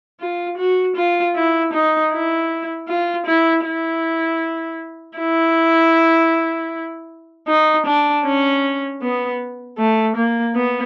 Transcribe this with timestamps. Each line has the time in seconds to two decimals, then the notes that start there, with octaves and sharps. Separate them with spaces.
0.20 F4
0.58 F#4
0.96 F4
1.35 E4
1.73 D#4
2.12 E4
2.88 F4
3.26 E4
3.65 E4
5.18 E4
7.48 D#4
7.86 D4
8.25 C#4
9.02 B3
9.78 A3
10.16 A#3
10.55 B3